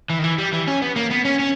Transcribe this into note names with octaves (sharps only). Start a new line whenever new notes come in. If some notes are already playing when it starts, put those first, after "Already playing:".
E3
D#3
E3
G3
E3
C#4
B3
A#3
B3
C#4
C#4